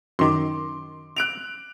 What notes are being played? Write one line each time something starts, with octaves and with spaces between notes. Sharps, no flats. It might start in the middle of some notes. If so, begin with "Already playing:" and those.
F#2 D#3 C6 D6
F#6 D7 F7